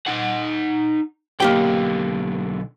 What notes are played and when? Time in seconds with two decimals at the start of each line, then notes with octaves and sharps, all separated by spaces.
0.07 D#4 F#5
1.40 B1 D3 A#3 G4 G5